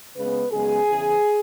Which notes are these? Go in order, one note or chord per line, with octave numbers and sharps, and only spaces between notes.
C#3 G#3 B3 B4
F#2 C#3 G#3 B3 G#4
E2 C#3 E3